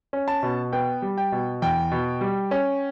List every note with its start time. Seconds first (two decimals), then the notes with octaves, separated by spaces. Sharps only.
0.13 C#4
0.28 A5
0.43 B2
0.73 B3 G5
1.02 G3
1.18 G5
1.32 B2
1.62 E2 G5
1.92 B2
2.21 G3
2.51 C#4